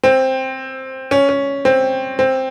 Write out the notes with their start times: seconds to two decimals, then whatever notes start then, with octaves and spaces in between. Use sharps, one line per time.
0.03 C4
1.11 C#4
1.29 C#4
1.65 C4
2.19 C4